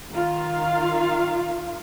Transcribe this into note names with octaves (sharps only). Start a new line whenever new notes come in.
D#3 F4 F5